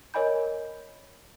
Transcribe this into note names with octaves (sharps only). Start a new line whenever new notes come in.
A#4 C#5 D#5 G#5 B5 G6